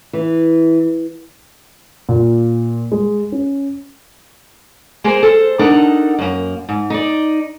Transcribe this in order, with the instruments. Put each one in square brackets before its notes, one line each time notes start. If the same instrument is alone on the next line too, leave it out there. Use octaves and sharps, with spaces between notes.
[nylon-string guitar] E3
[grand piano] A#2
G#3
C#4
[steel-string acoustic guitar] A#3 G#4 A#4 C5
A4 C5
D4 D#4 A4 A#4 F#5
F#2 A#3
G#2
D#4 D5